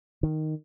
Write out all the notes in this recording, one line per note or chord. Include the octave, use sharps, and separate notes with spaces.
D#3